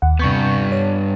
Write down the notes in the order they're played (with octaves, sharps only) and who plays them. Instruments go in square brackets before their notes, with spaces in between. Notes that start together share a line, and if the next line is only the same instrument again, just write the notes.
[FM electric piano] D#2 F#5
[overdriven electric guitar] G2 B3 [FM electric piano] C3 C#6 G6
[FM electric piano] C#5